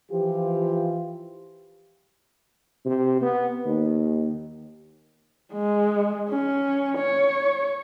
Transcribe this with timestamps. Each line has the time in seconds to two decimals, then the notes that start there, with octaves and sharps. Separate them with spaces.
0.12 E3 F3 F4 G4
2.85 C3
3.22 B3
3.65 D#2
5.53 G#3
6.29 C#4
6.98 C#5